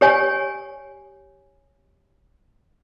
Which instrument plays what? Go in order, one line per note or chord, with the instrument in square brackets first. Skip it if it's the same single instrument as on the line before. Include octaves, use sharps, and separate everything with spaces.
[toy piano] G4 C#5 G#5